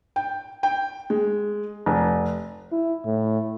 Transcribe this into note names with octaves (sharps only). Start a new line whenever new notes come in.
G5
G5
G#3
F1
E4
A2